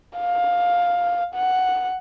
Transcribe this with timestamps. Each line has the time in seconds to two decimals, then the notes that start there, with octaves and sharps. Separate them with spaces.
0.17 F5
1.35 F#5